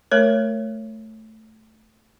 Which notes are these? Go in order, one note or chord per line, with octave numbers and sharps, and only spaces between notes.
A3 A#4 C#5